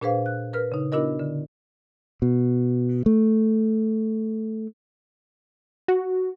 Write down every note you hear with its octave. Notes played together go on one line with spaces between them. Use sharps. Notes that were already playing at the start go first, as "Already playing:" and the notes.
A#2 D4 G#4 B4 C5 F5
F#6
A#4 B4 F6
C#3 D#4
B3 D4 E4 F#4 A#4 D#5
D3
B2
A3
F#4